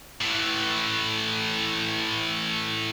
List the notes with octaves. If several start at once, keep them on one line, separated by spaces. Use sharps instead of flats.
A2 E3